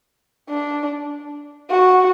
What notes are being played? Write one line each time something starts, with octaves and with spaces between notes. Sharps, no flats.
D4
F#4